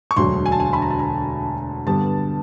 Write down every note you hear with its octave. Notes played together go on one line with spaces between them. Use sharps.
C#6
E1 D2 D3 F#3 C6
G#5
A5
G#5
B5
A#5
A5
A#5
G2 D3 G3 B3 A5